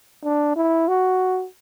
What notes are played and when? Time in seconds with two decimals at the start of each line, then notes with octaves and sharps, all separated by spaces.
0.24 D4
0.56 E4
0.88 F#4